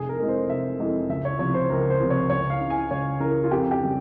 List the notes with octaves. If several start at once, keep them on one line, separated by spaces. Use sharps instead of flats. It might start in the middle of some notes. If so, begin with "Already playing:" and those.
Already playing: F1 G#4
A#4
F2 E3 G#3
C5
F1 E5
F2 E3 G#3
C#2 E5
C#5
C3 F3 C#5
C5
C#2 A#4
C5
C3 F3
C#5
C#2 C#5
F5
C#3 E3
G#5
C#2 C#5
C#3 E3 A#4
F4
F2 G4
G4
C#3 G3